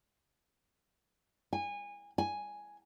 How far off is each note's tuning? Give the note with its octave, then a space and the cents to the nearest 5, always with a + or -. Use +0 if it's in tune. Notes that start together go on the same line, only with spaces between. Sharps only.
G#5 -25
G#5 +0